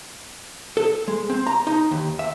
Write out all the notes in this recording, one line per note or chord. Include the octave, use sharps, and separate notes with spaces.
A4
G#3
C4
A#5
D#4
D#2
E5